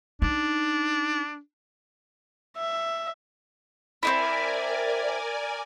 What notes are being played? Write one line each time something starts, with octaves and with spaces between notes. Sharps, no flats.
D4 D#4
E5
C4 D#4 E4 A#4 D5 G#5